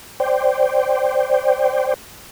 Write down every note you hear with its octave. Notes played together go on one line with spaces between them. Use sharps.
C5 D5 G5